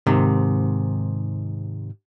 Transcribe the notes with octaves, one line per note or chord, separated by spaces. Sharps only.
G#2 C3 D#3